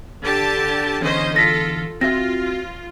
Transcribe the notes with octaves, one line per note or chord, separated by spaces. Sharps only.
D3 G4 A5
E2 D3 C#4 C5 D#5
F4 A4 A#6 B6
C4 F4 F#4 E5 A#6